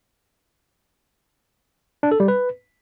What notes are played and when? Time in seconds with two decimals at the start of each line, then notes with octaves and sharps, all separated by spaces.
2.03 D4
2.12 A4
2.20 G3
2.28 B4